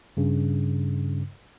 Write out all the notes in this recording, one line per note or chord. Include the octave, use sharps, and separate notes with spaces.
G2 C#3